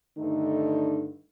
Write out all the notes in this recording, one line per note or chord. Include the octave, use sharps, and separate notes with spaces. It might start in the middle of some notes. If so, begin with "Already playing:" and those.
G2 D3 D#3 A3 D#4